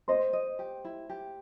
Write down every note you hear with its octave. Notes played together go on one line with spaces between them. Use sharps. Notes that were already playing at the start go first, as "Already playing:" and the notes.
C5 D#5 C6
D#5
G4
E4
G4